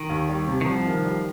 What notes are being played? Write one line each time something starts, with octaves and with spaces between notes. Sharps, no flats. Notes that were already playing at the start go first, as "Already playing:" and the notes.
Already playing: D#3
D#2
G3
C3
D#3
C2 F3
D#3
G3